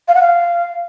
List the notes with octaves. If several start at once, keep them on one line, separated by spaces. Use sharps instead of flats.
F5
F#5
F5